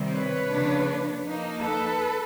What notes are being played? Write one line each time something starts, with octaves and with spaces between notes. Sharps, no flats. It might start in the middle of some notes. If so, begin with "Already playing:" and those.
Already playing: C3 D#3 G3 C4
B4 C#5
C#3 F3 A#3 D4
F3 A#3 D#4
A4 B4